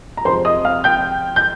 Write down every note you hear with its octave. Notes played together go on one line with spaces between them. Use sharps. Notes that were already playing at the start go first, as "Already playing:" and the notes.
A#5
F2 C3 F3 G#3 C5 C6
D#5 D#6
F5 F6
G5 G6
G6